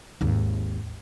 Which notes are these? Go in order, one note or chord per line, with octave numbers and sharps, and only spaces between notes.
G#1 D#2